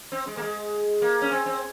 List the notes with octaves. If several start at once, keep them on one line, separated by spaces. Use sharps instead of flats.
C4
G#3
A#3
G#3
A#3
C#4
C4
C4